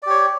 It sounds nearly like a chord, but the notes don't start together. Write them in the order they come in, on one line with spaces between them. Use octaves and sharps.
D5 G4 C#5